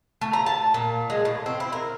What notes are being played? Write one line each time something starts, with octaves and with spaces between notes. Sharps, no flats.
A3
A#5
A5
A#2
G#3
A2
C4
E4
A#4